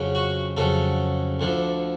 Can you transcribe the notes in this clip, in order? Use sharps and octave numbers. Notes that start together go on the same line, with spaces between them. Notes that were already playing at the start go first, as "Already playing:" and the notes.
Already playing: F2 C#3 F#3
F#4
F2 C#3 F#3 A4
D2 D3 F3